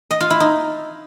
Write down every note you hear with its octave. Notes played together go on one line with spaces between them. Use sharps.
D#5
F4
E4
D#4